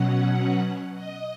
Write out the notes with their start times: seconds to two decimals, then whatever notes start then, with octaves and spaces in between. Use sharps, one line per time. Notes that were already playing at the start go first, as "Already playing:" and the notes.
Already playing: B2 F#3 C#4 F#5
0.95 D#5